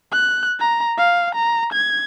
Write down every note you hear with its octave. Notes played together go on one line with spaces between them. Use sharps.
F#6
A#5
F5
A#5
G#6